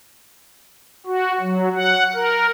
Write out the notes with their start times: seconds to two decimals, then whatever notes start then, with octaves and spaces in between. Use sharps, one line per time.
1.06 F#4
1.40 F#3
1.75 F#5
2.14 A#4